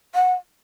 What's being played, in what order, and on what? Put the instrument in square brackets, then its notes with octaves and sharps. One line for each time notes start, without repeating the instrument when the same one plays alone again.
[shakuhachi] F#5